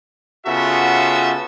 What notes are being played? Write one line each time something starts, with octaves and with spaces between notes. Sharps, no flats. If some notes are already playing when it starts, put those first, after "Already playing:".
C#3 B3 F4 F#4 A4 E5